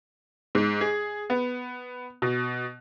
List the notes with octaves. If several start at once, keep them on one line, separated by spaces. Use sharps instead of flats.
G#2
G#4
B3
B2